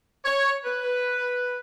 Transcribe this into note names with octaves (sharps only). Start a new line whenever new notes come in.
C#5
B4